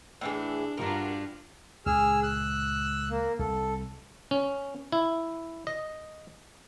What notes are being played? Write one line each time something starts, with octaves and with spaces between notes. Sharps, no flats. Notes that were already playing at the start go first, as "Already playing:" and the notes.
A2 E3 D4 G#4
G2 D4 F4 F#4 A#4
C#2 A#2 G#4 E6 F6
E6 F#6
A#3
C2 A4
C#4
E4
D#5